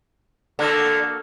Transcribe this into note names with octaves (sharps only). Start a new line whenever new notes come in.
D3 A#3 F#4 A4